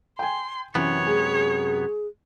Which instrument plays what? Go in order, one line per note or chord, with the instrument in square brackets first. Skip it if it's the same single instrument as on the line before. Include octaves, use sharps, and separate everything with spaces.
[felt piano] G5 G#5 [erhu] C6
[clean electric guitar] F#2 C3 B3 [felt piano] E3 [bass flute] C#4 [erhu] C#5
[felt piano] G#3 [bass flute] G#4